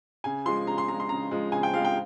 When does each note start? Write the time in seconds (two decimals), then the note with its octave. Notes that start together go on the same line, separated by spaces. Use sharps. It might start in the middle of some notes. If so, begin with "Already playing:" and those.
0.24 C#3 G#5
0.46 F3 G#3 C6
0.67 C#3 A#5
0.78 C6
0.88 F3 G#3 A#5
1.00 C6
1.09 C#3 A#5
1.31 F3 G#3
1.52 C#3 G#5
1.63 G5
1.73 F3 G#3 F5
1.85 G5